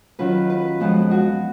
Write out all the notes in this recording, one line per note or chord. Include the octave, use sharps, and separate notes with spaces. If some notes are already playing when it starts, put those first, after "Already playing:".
D#3 F#3 C#4 F4 B4
B4
F2 F3 G#3 B3
F#4